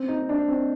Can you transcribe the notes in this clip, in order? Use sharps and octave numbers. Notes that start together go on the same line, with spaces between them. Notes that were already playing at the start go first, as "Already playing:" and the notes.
Already playing: C4
D#4
D4
C4